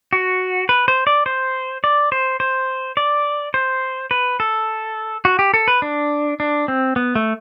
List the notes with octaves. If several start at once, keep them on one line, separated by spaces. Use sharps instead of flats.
F#4
B4
C5
D5
C5
D5
C5
C5
D5
C5
B4
A4
F#4
G4
A4
B4
D4
D4
C4
B3
A3